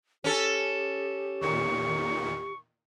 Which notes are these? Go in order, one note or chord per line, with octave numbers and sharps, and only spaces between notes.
C#4 G4 A4
E2 A#2 D#3 C#6